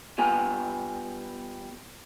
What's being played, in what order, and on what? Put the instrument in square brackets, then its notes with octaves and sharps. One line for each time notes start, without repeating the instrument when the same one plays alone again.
[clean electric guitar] G3 B3 F4 B4 G#5